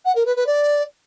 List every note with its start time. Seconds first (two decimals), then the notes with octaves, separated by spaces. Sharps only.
0.05 F#5
0.15 A#4
0.25 B4
0.36 B4
0.46 D5